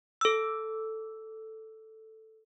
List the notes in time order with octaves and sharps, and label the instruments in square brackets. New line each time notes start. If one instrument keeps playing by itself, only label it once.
[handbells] A4 E6